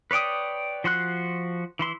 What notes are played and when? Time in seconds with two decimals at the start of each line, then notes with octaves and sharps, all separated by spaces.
0.11 B4 C#5 D5 G5 D#6
0.84 F3 F#4 C6 F#6
1.79 E3 E4 C6